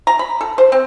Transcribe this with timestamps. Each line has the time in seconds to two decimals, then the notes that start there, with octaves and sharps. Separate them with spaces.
0.07 A#5
0.19 B5
0.41 A4
0.58 C5
0.72 C4